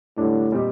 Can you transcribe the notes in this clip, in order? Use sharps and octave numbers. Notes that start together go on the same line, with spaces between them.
A2 D3 G3 D4
A#2 G3 C4 D#4 G4